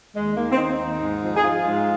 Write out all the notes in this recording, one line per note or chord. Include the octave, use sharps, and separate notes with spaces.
D#2 G#3
D#3 A#3
C4
D#3 D#4
D#2
G#2
F3
G#4
F3 F4
G#2